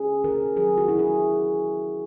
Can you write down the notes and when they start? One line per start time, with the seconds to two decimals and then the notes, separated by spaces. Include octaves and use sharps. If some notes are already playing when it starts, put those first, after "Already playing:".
Already playing: C#4 G#4
0.24 D#3 A#4
0.56 F#3 G#4
0.77 F#4
0.89 E4
0.99 G#4